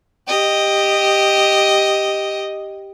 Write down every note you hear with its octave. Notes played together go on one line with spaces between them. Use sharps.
G4 D#5